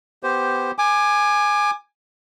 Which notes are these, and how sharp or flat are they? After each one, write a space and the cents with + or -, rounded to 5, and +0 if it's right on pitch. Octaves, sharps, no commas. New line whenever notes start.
B3 +10 G4 +0 C5 +0
G#5 +0 D6 +30